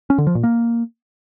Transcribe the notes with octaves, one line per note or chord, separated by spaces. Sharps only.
C#4
D3
F3
A#2
A#3